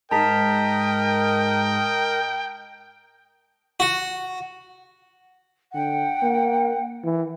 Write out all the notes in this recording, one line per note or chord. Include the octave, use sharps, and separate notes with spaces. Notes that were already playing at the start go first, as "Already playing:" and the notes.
G#2 A#4 D#5 G5 A5 A#5 B6
F#4
D3 F#5 G5
A#3
E3